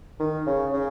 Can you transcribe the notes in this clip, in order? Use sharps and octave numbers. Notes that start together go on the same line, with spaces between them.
D#3
C#3
C#3